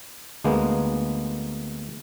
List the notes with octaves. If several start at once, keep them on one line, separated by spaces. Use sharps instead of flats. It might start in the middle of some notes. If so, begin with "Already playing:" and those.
D2 G#3 A#3 B3